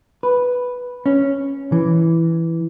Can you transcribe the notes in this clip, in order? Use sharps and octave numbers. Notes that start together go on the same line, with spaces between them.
B4
C#4
E3